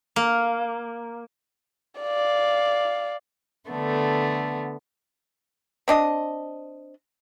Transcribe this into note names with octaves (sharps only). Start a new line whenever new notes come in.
A#3
D5 F5
D3 A3 B3
C4 D4 D#5